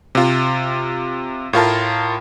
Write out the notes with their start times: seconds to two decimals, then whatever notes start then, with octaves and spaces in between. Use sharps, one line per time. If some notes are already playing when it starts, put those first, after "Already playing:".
0.15 C3 F4
1.53 A2 F4 A#4 A5